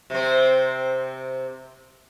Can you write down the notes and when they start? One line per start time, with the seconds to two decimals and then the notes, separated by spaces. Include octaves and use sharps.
0.10 C3 C4